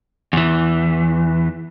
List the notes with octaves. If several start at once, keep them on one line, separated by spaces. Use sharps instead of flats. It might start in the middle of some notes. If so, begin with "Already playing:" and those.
E2 E3